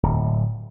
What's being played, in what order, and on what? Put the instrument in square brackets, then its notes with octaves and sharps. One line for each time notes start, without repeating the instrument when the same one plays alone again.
[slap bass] D1